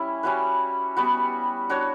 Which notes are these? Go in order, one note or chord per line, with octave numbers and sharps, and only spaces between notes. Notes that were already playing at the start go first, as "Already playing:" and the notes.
Already playing: G3 C#4 E4
G3 C#4 F#4 B4
G3 B3 F#4
D4 F#4 C#5